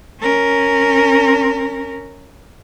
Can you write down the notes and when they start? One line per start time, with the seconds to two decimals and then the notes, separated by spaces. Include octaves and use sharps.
0.20 C#4 A#4